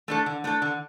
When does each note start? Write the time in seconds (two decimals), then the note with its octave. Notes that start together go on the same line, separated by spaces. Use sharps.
0.08 A3 D4 A4
0.26 D3
0.44 A3 D4 A4
0.62 D3